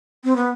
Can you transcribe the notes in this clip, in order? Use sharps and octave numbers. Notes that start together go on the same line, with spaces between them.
C4
B3